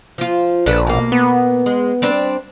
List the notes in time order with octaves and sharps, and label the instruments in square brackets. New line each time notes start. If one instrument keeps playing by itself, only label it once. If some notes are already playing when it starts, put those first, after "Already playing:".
[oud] F3 F4
[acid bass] A#1 [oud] D4 A4 B4
[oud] B2 A#3
[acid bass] B3
[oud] G#3
G3 C4 D4